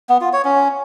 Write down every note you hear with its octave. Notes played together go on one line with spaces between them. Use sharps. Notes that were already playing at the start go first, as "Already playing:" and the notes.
B3
F4
C#5
C#4